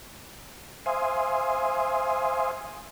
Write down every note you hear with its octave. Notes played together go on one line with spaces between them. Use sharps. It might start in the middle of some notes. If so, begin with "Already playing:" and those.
C5 E5 F5 G#5 C6 D#6